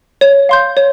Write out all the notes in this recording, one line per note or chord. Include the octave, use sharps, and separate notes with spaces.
C#5
F5 C6 G6
C#5